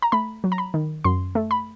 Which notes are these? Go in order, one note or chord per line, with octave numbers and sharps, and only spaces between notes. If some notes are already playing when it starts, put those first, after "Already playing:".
A#5
A3 B5
F#3
A#5
B5
D#3
F#2 C6
A3
B5